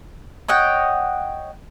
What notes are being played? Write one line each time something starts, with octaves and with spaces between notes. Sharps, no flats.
C#5 D#5 F#5 G5